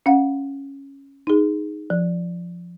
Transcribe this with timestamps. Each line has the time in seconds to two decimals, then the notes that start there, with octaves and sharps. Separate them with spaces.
0.06 C#4 F5 F#5
1.27 D#4 G#4
1.90 F3